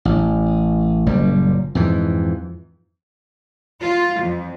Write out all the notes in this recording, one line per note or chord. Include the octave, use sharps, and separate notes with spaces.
A1
F#1 A#2 G3
F2 G#2 E3
F4
F2